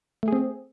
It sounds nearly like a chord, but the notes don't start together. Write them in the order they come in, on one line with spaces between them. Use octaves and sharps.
A3 G#4 C4